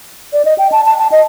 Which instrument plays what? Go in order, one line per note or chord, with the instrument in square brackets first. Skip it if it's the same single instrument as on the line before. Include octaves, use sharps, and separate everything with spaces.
[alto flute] D5
D#5
G5
A5
A5
A5
D#5